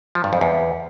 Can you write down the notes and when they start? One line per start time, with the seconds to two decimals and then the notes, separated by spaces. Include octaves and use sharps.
0.15 F3
0.24 G2
0.33 F2
0.41 E2